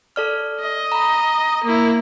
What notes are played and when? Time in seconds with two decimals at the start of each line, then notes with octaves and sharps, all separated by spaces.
0.16 A4 D5 F6
0.60 D#5
0.92 A#5 B5
1.64 A#3 E4